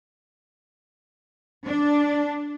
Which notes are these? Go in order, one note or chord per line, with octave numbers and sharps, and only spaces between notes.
D4